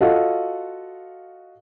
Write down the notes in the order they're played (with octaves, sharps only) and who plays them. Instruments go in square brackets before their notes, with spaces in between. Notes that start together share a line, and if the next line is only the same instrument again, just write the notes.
[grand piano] F4 F#4 A4 D#5 F5 F#5